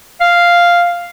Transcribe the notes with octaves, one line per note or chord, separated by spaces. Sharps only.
F5